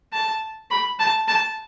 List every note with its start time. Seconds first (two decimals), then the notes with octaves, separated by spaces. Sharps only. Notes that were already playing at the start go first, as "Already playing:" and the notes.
0.13 A5
0.71 B5
0.99 A5
1.28 A5